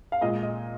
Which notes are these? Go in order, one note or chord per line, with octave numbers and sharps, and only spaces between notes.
F5
A#2 G#3 D#5
D#5